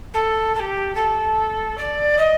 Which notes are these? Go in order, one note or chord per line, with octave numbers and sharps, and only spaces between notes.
A4
A4
G4
A4
D5
D#5